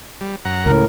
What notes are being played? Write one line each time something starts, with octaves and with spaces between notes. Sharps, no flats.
G3
F#2 F#5 A#5
C#2 A2 C#3 A#4